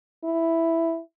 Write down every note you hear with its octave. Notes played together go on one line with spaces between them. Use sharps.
E4